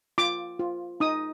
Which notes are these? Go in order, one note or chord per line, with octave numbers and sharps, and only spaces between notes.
F4 D6
F4
D#4 D#6